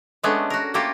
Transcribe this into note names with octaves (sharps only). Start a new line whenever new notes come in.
G#3 A3 B3 C#4 D4
F#4 A#4
A3 A#3 F4 G4 A4 A#4